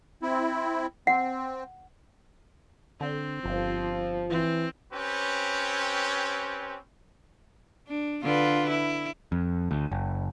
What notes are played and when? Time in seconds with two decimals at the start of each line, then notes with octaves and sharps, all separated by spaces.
0.22 C4 E4
1.07 C4 F#5
3.01 D3 C4
3.45 G1 F3
4.30 E3 C4
4.93 C4 C#4 G4 B4 C#5
7.88 D4
8.23 D3 F4 B4
8.70 E4
9.32 F2
9.71 D2
9.92 F#1